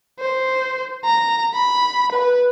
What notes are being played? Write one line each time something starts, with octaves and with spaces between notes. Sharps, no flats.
C5
A#5
B5
B4